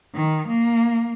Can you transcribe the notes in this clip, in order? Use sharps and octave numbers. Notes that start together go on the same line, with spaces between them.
D#3
A#3